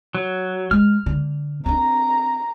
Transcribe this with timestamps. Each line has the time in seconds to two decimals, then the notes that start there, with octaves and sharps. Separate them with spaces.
0.15 F#3
0.71 G#3 F6
1.06 D3
1.66 C4 D4 A#5